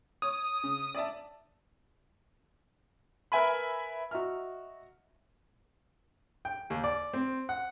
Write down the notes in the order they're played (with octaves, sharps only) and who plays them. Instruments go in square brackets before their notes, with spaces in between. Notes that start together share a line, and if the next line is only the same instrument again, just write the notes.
[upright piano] C#5 [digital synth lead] D#6
[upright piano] C#3
D5 E5 A5
A#4 B4 E5 G#5 B5
[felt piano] F#4 D#5 E5 A#5 F6
[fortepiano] G5
D#2
D5
C4
F#5